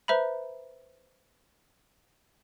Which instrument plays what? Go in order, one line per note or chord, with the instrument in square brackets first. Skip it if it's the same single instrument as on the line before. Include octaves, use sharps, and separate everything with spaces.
[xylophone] B4 C5 E5 A#5 B5